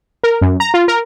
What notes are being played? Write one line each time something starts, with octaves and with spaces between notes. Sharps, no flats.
A#4
F#2
A#5
F4
A#4